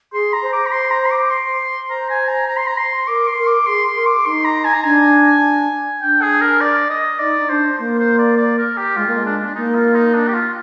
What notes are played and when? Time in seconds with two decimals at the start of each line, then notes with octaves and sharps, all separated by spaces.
0.13 G#4 C6
0.33 A#5
0.42 C5
0.53 D6
0.66 A#5
0.72 C6
0.91 A#5
1.06 C6
1.11 D6
1.30 C6
1.89 C5 A#5
2.10 G#5
2.28 A#5
2.48 A#5
2.57 C6
2.67 A#5
2.77 C6
3.07 A#4 D6
3.27 C6
3.37 A#4
3.47 D6
3.66 G#4 C6
3.86 C6
3.96 A#4
4.06 D6
4.25 D#4 C6
4.44 A#5
4.64 G#5
4.73 A#5
4.84 D4 G#5
6.02 D4 G5
6.22 G#4
6.41 A#4
6.61 D5
6.90 D#5
7.19 D#4 D5
7.41 D#4
7.49 D4 C5
7.78 A#3 C5
7.99 C5
8.18 D5
8.37 D5
8.58 A#4
8.77 G4
8.96 G#3 F4
9.07 A#3
9.18 G#3
9.26 D4
9.45 D4
9.55 A#3 D#4
9.75 F4
9.95 D#4
10.14 D4
10.28 G4
10.34 F4